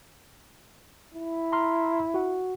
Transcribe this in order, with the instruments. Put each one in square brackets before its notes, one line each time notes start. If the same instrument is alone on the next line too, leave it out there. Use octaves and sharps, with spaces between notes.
[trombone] E4
[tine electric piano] A#5 C6 F6
F#4 F#5